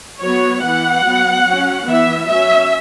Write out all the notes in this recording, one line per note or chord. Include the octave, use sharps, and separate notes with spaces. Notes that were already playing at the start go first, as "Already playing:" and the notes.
F#3 B3 C#5
E3 B3 F#5
F#3 B3
F#3 C#4
E3 B3 E5
F#3 C#4 E5